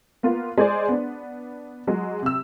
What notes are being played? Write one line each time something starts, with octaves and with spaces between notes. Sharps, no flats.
A#3 B3 F4
G#3 G#4 C5 D5
B3 D4
F#3 G#3
C3 E6